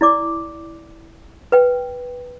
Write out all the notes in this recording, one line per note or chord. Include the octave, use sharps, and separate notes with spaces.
E4 D5 D6
B4 G5